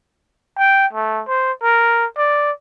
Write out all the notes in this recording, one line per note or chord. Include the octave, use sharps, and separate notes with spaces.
G5
A3
C5
A#4
D5